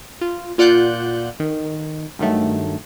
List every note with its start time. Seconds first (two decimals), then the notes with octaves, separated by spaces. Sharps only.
0.21 F4
0.58 A#2 F4 D5 F#5 F#6 G6
1.40 D#3
2.19 G2 D#3 F#3 A3